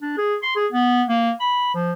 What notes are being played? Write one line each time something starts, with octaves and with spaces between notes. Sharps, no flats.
D4
G#4
C6
G#4
B3
A#3
B5
F3